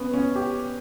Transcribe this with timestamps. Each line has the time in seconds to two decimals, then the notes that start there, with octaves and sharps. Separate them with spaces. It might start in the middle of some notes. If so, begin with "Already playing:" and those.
Already playing: B3 C#4
0.14 C#4
0.36 G4